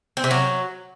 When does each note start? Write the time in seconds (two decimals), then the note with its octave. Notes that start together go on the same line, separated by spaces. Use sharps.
0.17 C4
0.24 C3
0.31 F#3